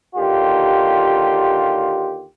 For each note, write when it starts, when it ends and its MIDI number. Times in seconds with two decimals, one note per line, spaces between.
0.16 2.25 39
0.16 2.25 50
0.16 2.25 65
0.16 2.25 67